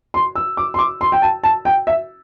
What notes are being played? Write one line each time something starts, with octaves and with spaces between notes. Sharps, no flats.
C6
E6
D6
C6
D6
C6
G5
A5
A5
G5
E5